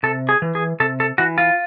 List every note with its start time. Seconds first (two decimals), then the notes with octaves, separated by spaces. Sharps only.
0.03 C3 A4
0.29 G#4
0.42 E3
0.55 G#4
0.80 C3 A4
1.00 A4
1.18 E3 F#4
1.38 F4